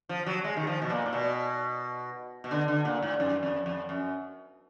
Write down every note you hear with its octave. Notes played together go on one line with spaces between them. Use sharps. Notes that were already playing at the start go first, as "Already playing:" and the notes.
F3
F#3
G#3
D#3
F3
B2
A#2
A#2
B2
B2
D3
D3
A#2
G#2
F#2
F2
F2
F#2